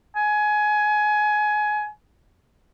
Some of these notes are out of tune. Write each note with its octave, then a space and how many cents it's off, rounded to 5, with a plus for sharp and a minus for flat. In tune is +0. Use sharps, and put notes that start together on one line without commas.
G#5 +20